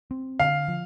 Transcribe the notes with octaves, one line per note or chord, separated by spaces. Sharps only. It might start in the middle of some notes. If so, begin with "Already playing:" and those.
C4
D3 F5
F3